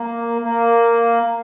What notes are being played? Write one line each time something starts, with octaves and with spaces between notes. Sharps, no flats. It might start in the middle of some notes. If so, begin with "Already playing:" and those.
Already playing: A#3
A#3